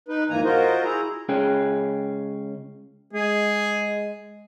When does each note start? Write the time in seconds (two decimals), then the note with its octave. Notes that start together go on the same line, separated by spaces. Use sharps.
0.09 D#4 B4
0.30 F2 G#2 E3 A#3 G#5 A#5
0.45 F4 F#4 A#4 C5 D#5
0.84 E4 G#4 A#5
1.29 C#2 C#4 G#4 G5
3.13 G#3 G#4